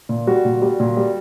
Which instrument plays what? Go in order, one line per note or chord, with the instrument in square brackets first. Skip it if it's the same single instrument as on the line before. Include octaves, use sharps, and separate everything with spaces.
[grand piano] A#2
G3 F#4
A#2
G3
A#2
G3